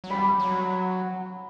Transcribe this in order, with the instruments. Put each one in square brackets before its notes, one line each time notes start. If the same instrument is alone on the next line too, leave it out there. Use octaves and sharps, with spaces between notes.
[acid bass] F#3
[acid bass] G3 [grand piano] B5
[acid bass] F#3